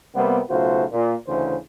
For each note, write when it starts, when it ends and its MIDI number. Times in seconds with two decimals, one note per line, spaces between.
0.16 0.40 48
0.16 0.40 55
0.16 0.40 58
0.16 0.40 59
0.50 0.84 35
0.50 0.84 49
0.50 0.84 57
0.50 0.84 65
0.50 0.84 66
0.50 0.84 72
0.92 1.14 46
1.28 1.57 38
1.28 1.57 49
1.28 1.57 52
1.28 1.57 72